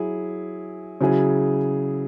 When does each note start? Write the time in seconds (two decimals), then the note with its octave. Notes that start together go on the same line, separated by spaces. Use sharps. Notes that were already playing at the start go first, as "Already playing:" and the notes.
Already playing: F#3 E4 G#4
1.01 C#3 F#3 E4 G#4